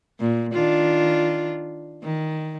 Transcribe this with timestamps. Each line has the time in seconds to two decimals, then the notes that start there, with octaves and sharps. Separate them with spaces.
0.20 A#2
0.53 D#3 D4 F4
2.03 D#3